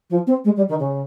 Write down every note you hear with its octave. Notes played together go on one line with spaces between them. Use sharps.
F3
C4
G#3
G3
D#3
C#3